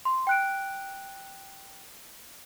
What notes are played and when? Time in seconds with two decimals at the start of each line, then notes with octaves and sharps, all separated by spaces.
0.05 C6
0.27 G5 F#6 D7